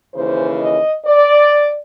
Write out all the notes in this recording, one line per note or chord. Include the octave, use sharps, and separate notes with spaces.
D#2 C#3 E3 C5
D#5
D5